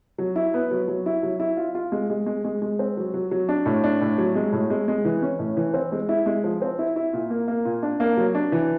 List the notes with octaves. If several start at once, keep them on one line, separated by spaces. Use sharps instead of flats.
F#3
E4
B3
F#3
F#3
E4
F#3
E4
F4
F4
G#3
G#3
G#3
G#3
G#3
C4
F#3
F#3
F#3
D4
A2
D4
A2
F#3
G#3
A2
G#3
G#3
E3
C#4
A2
E3
C4
G#3
E4
G#3
F3
C4
E4
E4
A#2
A#3
A#3
A#2
D4
A#3
F#3
D4
E3